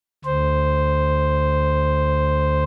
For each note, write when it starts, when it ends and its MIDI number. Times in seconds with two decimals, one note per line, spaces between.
0.25 2.63 38
0.25 2.63 72